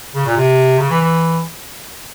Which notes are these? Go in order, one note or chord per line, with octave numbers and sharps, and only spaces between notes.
C#3
A#2
C3
C#3
E3
E3